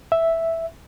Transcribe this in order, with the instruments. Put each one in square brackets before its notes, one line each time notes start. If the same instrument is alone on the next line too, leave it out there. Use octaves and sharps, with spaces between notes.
[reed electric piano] E5